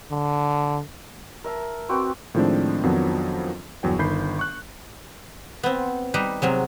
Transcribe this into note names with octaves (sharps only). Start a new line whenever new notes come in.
D3
A#4 E5 A5
C4 F#4 B4 G5
A2 D#3 F3 G#3 C4 D4
F2 D#3 F3 F#3 B3 D4
G1 E2 F#3 G5
G1 D#3 B5 G6 C7
C#6 F#6
B3 C4
G3 D#4 B4
C3 F#3 G#3